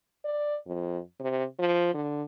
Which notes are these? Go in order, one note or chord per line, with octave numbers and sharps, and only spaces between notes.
D5
F2
C3
F3
D3